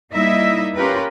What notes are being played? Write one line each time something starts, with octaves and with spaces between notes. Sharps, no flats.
G3 A#3 D#4 E4 D#5 E5
C#4 F4 G4 A#4 B4